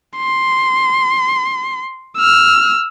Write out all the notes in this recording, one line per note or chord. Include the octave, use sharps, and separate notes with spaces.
C6
E6 F6